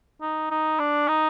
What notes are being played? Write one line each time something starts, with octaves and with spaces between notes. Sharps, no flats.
D#4
D#4
D4
D#4